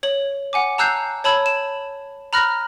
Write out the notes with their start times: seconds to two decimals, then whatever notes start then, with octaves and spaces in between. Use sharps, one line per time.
0.03 C#5 F#7
0.53 F#5 G#5 D6
0.78 A5 A#5 E6 F#6 G6 C7
1.24 C#5 A5 B5 E6 G#6
1.46 E7
2.33 A#5 B5 F6 F#6 A#6